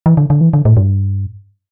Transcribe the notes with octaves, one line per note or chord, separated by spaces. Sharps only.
E3
D3
D3
E3
D3
A2
G2